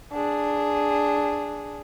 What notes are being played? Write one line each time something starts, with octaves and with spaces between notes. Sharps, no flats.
D4 G#4